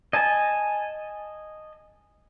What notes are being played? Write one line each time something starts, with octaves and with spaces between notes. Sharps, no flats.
D#5 G#5 A5